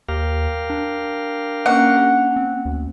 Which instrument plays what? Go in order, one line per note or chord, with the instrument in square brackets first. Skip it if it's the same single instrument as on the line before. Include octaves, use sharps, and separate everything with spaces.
[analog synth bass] D#2 [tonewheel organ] G4 A#4 F5
[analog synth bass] D4
[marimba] A#3 C#4 [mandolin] F#5
[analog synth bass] C4
D2